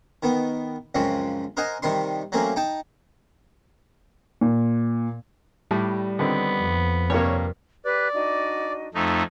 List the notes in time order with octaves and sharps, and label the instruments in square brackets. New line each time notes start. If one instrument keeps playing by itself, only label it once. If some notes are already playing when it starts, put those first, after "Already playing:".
[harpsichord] D#3 B3
C#2 F#2 F3 C4 C#6
A#4 C5 D#5 F#5 G#5
C3 D#3 G3 C6
F#3 A3 A#3 C4 C#4
D#4 G5 A5
[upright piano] A#2
[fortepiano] A2 [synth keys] G3
[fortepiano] D3 D#3 C4 [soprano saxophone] B3
[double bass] F2
[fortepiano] G2 C3 A#3 [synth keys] C#5
[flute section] G4 B4 F#6 [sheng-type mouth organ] D5
[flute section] D4 D#4 F#4
[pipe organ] F2 A3 D#4